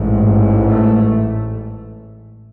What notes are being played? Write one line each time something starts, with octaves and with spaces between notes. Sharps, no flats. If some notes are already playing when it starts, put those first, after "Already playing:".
Already playing: A1 G#2
A3